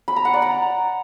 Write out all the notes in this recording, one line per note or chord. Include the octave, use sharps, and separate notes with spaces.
B5
A#5
F#5
D5
A#5